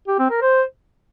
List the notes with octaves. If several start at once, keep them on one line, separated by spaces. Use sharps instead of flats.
G4
C4
A#4
C5